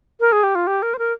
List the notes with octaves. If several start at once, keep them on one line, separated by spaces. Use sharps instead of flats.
A#4
G#4
G4
F4
G4
A#4
C5
A#4